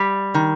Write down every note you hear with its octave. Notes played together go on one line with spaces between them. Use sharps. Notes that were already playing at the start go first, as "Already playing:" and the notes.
Already playing: G3
D#3